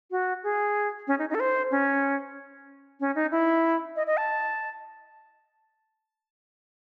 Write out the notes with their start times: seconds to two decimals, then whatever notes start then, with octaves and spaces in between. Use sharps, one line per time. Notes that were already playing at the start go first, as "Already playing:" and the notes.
0.11 F#4
0.43 G#4
1.08 C#4
1.19 D#4
1.30 D#4
1.35 A4
1.40 C5
1.71 C#4
3.00 C#4
3.15 D#4
3.31 E4
3.96 D#5
4.07 D#5
4.17 A5